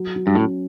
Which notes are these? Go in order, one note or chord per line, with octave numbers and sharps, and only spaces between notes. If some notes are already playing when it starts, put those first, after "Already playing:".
Already playing: F#3
F#3
G2
A2 C#4